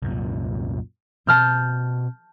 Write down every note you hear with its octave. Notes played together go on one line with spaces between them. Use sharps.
C2 F#2 A#2
B2 C4 A5 F6 G6